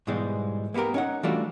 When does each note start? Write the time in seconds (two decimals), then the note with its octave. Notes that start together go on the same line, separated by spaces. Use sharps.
0.07 G#2 B2 E3 G3 G#3
0.74 A#3 B3 F#4 G4 A#4
0.94 C#4 D#4 F#5
1.23 E3 G3 A3 D4 F4 F#4